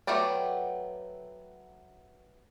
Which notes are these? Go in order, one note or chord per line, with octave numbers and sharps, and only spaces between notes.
F#3 A3 B3 G4 D5